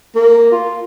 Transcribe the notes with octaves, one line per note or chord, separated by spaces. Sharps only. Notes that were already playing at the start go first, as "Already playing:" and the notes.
A#3
F4